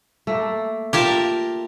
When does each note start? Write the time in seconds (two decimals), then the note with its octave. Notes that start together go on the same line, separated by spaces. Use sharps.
0.27 A3 A#3
0.93 F4 G4 A#4 A5